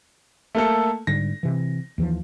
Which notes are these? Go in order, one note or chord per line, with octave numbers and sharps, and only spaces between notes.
A3 A#3 A4
G#2 D3 G3 A#6
C3 E3
D#2 E3 F3